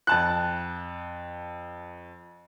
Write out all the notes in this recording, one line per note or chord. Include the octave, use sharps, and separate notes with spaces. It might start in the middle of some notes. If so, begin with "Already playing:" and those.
F2 A5 F#6